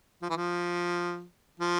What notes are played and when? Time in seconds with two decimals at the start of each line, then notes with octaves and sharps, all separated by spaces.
0.22 F3
0.30 E3
0.37 F3
1.60 F3